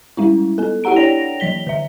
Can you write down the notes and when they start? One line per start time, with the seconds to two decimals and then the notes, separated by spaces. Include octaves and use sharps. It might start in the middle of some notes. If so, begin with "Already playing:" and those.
0.17 G3 G#3 C#4 E4
0.58 B3 A4
0.84 E4 G4 F#5 A#5 D7
0.96 D4 C#5 D5 G5 A#6 F7
1.40 E3 F#3 B6 G7
1.67 D3 E5